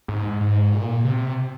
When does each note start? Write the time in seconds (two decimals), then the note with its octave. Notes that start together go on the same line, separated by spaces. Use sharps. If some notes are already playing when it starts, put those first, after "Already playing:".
0.08 G#2
0.41 G#2
0.72 A#2
1.04 C3